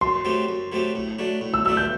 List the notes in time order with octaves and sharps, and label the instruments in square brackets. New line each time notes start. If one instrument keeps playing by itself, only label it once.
[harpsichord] F#2 [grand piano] C6
[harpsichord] F#3 A3 C4 G4
F#2
F#3 A3 C4 G4
A2
F#3 A3 D4
A2
[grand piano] E6
[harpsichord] F#3 A3 D4 [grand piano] E6
[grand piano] G6